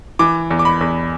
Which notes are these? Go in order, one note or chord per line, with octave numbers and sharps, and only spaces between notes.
E3 D6
E2
D6
B5
E2